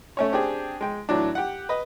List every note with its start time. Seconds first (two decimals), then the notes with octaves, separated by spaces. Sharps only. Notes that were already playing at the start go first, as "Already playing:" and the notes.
0.17 A3 C#4 C#5
0.32 C4 D4 G4 G#4
0.81 G#3 G5
1.09 A2 E3 F#3 D4
1.35 G4 F#5
1.69 B4 D#5